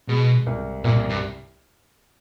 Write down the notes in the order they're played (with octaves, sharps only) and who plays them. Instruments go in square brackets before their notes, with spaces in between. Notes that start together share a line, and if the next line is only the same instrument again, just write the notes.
[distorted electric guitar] B2 [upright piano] G#3
[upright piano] C2
[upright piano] C2 [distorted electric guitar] A#2
[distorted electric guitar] G2